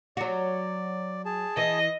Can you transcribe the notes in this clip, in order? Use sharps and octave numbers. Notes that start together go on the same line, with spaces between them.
F#3 F#4 D5
G#4 A5
E3 D#5